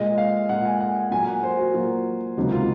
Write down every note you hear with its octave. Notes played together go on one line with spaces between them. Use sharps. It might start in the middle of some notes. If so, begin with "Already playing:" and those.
Already playing: A#2 G#3 D#5
F5
A#2 G#3 F#5
G#5
F#5
G#5
A#2 F#3 A#3 G#5
F#5
C5
F#4
A#2 F#3 A#3 F4
C#2 C3 D#3 F#3 A#3
F4